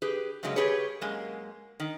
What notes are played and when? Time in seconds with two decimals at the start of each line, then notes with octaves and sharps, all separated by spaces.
0.02 G4 G#4 B4
0.43 F#2 C#3 F#3 G#3 A#3
0.56 G4 G#4 B4 C#5
1.01 F#2 G#3 A#3
1.80 D#3